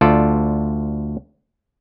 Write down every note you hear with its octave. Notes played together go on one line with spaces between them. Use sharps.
D2 F4 A4 D5